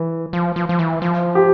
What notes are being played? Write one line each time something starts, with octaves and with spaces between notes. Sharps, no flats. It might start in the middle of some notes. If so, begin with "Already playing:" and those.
Already playing: E3
F3
F3
F3
E3
F3
G4